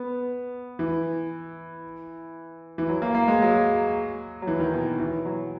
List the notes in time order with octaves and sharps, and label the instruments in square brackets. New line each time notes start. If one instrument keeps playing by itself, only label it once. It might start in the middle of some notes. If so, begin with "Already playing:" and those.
Already playing: [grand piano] B3
E3
E3
F#3
A#3
A#3
G#3
F#3
F#3
E3
D#3
B2
E3
F#3